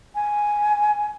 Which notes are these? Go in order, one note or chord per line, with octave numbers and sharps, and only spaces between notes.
G#5